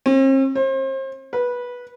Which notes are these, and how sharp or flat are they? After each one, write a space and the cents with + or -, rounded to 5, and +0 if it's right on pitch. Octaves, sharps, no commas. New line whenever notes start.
C4 +45
C5 +35
B4 -15